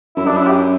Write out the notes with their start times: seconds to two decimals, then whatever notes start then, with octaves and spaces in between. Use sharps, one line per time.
0.16 F#2 E4
0.25 G2 D4
0.31 F#2
0.37 E4
0.47 G4